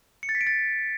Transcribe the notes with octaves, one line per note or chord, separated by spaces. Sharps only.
C#7
A6
B6
D7
A6